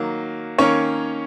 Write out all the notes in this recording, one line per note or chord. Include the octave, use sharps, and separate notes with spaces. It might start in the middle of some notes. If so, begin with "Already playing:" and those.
Already playing: D#3 F#3 A#3
D#3 A#3 C#4 C#5